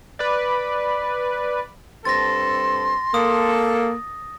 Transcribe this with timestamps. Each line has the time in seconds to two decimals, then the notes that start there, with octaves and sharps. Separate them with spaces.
0.19 B4 D5
2.05 G2 C4 A4 C6 A6 A#6
3.14 A#3 A4 D#6